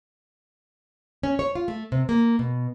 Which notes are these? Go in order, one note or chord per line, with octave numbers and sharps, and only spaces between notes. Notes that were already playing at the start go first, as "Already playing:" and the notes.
C#4
C#5
F4
A3
C3
A#3
B2